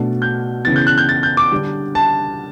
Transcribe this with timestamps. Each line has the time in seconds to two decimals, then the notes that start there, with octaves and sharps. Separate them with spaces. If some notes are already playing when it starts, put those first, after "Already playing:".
Already playing: B2 A3 D4
0.22 G6
0.65 C#3 E3 B3 A6
0.76 G6
0.87 F#6
0.98 G6
1.09 A6
1.23 G6
1.37 D6
1.51 D3 G3 D4
1.95 A5